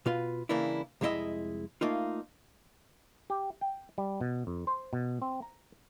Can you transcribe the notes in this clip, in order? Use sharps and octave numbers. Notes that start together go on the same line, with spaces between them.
B2 F4 B4
C#3 E3 A#3 D4 E4
C2 F2 G#3 E4 D#5 E5
A3 A#3 D#4 F4
G4
G5
G3
B2
F2
C5
B2
C4
A#5